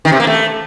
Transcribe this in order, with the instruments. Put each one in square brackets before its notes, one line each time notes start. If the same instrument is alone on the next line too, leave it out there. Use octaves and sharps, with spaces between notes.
[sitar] D#3
C3
A#3
A3